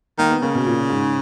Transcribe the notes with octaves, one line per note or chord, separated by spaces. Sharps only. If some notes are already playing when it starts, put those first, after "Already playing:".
D#3 A#3
B3
C#3 A#3
B2
A#2
G#2